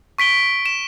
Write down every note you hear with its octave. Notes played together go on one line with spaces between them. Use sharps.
C#6 B6 D7 G7
E7